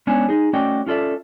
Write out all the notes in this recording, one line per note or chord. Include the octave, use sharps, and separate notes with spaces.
G#3 B3 C#4 D4 C#5 G#5
D#4 G#4
A3 C#4 F#4 D5 D#5 G5
C#4 F4 A4 D5 E5